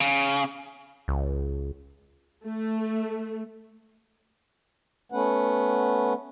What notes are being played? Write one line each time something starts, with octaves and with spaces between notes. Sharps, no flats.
C#3
C#2
A3
A3 B3 C#4 B4 F#5